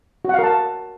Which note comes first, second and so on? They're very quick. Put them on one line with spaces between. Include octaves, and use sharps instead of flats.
F#4 F#5 F5 A#4 A5